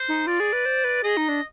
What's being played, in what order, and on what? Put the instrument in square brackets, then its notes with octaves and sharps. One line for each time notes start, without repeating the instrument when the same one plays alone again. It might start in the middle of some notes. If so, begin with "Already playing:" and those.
Already playing: [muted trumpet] C5
[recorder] D#4
[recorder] F4 [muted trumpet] D5
[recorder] G#4
B4
C5
B4
[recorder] G#4 [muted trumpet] D#5
[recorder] D#4
D4